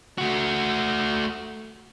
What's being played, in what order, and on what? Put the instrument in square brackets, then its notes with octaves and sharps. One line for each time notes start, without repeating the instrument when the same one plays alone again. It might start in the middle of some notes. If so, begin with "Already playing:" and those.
[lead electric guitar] A3 F#4